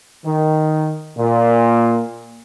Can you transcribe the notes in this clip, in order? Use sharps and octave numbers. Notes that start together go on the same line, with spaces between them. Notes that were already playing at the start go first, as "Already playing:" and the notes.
D#3
A#2